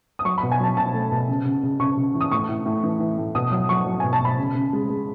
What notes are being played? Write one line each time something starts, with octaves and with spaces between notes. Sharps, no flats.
D#6
F#3 C#6
B5
B2
G#5
F#3 A5
B2 A5
A3
B2
C#3
C#3
C#3
C#3 C#6
C#3
E3
D#6
A2 C#6
A2
A2
E3
E3
A2
B2 D#6
F#3 D#6
F#3 C#6
F#3
B2 G#5
A5
B2 B5
C#3
C#3
G#3
G#3